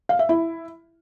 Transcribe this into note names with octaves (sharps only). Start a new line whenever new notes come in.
F5
E5
E4